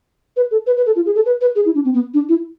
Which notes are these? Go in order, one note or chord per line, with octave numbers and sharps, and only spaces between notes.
B4
A4
B4
B4
A4
F4
G#4
A4
B4
B4
G#4
E4
D4
C4
B3
D4
E4